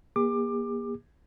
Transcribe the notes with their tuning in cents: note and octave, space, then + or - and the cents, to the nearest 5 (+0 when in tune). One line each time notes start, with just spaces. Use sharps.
A#3 +30 G#4 -45 D6 +20